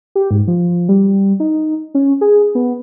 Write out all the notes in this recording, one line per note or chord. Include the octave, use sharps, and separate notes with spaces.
G4
G#2
F3
G3
D#4
C#4
G#4
B3